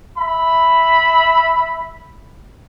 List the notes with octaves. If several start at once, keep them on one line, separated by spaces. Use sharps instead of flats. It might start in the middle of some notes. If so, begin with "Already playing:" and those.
E5 B5